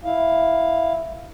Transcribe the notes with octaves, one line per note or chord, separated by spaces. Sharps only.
E4 F5